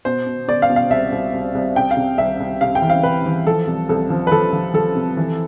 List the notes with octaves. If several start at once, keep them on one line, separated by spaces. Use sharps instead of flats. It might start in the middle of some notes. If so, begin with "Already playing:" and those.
B2 C5
B2
B2 D5
F5
B2
F5
C2 E5
C2
C2
C2
C3 G5
F5
C3
C2 E5
C2
C3 F5
G5
E3
F5
C3 B4
E3
F3 A4
C2
C2 A4
F3
B4
F3 A4
F3
F3 A4
C3
E3